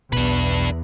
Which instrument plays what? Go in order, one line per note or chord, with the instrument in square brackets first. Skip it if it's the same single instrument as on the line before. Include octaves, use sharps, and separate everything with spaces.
[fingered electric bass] B1 B2 [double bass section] E2 [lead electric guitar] D4 B4